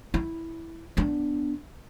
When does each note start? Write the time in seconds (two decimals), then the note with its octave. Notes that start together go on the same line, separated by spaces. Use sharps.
0.14 E4
0.97 B3 D4